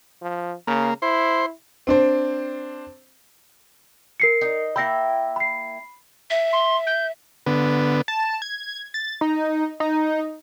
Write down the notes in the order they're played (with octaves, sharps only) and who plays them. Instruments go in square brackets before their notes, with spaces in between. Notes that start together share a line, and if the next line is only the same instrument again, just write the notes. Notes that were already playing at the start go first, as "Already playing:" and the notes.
[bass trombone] F3
[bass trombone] C#3 [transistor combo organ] A#3
[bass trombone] E4 [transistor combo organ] C5
[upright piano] C4 D4 C5
[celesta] A#4 C7 C#7
[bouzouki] D#4
[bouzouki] A#3 E4 G5 [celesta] B5 E6 A#6
[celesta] B5 C7
[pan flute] E5
[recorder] C6
G6
[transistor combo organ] D3 B3
[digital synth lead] A5
G#6
A6
D#4
D#4